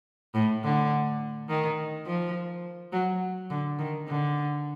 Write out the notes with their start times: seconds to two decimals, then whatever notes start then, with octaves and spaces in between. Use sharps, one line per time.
0.35 A2
0.64 D3
1.49 D#3
2.06 F3
2.93 F#3
3.50 D3
3.79 D#3
4.08 D3